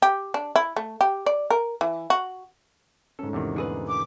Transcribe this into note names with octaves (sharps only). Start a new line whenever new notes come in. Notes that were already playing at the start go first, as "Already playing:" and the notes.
G4
D4
E4
A3
G4
D5
A#4
E3
F#4
G#2 A3 C#4 A4
E2 C3 D#3
D3 G#4 B4
D6